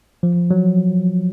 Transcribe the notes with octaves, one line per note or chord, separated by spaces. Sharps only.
F3
F#3